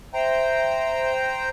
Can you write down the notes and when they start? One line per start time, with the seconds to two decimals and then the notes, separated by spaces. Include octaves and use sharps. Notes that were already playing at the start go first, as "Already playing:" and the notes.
0.14 C5 E5 G5 A#5